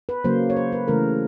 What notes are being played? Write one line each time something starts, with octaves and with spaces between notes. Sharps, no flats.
B4
C#3 F#3 A#3 C5
C#5
C5
B4
C#3 E3 A3 A#4